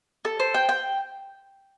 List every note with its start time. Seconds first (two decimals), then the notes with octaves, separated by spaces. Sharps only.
0.25 A4
0.40 C5
0.54 G5
0.69 G5